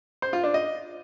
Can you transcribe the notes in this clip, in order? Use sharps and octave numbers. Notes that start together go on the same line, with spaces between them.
C5
F4
D4
D#5